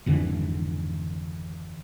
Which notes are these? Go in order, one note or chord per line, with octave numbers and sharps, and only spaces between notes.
G#1 F2 D3 E3